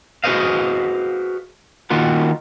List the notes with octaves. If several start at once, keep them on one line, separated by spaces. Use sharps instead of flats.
F#4 G#4 B4 C5 D#5 F5
D#3 A#3 F4 F#4